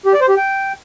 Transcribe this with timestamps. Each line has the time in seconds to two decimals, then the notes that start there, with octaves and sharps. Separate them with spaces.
0.06 G4
0.13 D5
0.21 C5
0.29 G4
0.37 G5